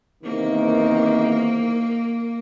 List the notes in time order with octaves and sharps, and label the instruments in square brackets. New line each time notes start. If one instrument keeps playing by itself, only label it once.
[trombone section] E2 C3 D#3 [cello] A#3